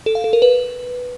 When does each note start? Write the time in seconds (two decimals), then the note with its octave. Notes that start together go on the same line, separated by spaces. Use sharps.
0.06 A4
0.15 F5
0.24 A4
0.33 A#4
0.42 B4